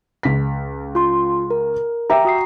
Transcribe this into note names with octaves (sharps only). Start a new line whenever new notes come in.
C#2 B6
F4 C6
A#4
G4 E5 G5 A#5
F#4 D#6 C7